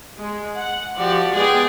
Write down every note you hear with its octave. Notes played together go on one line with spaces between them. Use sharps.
G#3
F#5
F3 F#4 G4 D5
G#3 B3 G#4 D5 G5